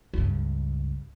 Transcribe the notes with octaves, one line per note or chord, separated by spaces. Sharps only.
C#2 G2